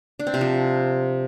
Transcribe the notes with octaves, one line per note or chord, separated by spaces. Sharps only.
D4
C4
C3
F3